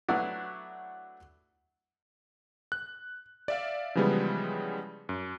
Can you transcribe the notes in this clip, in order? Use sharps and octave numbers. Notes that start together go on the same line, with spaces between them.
F#3 A3 B3 D4 E4 F#4
F#6
D5 E5 F5
C#3 E3 F3 G3 G#3 B3
F#2